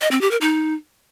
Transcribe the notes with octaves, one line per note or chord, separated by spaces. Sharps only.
D#5
C4
G4
A#4
D#4